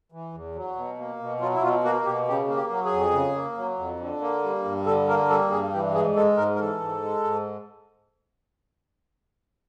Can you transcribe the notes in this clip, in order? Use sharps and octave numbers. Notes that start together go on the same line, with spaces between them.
E3
E2
F#3
B2
A#3
B2
F#3 F4
E4
B2 F4
A#3 F#4
B2 G4
C#3 G4
A#3
G4
F#3
G#4
F2
C#3
A#3
F#3
F2
D3
A#3
G3
G2
D3 A4
A#3 A#4
G3 A4
G2 G#4
E3 G4
G#2 G#4
G#3 A4
G#2 A#4
A#4
E3 A4
G#2
G#3
G#2